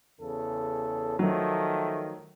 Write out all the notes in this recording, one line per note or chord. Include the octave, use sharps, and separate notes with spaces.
E2 C#3 A4
D#3 F3 F#3 A3